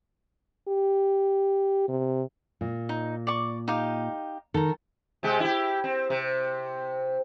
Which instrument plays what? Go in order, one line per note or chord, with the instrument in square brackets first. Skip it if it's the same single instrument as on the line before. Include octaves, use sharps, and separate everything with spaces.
[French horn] G4
C3
[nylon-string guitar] A#2
[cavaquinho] D#4
D5 C#6
D#4 G4 F5
[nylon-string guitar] D#3 [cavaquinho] A4 A#5
[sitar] C3 G#3 G4
E4 G4
C4
C3